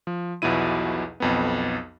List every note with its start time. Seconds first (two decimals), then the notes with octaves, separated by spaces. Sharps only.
0.07 F3
0.42 B1 E2 B2 F3 E4 D#7
1.20 B1 F2 B3